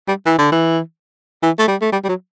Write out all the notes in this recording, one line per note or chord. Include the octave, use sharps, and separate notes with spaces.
G3
E3
D3
E3
E3
A3
G3
A3
G3
G3
F#3